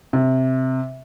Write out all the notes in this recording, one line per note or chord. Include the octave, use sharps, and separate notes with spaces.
C3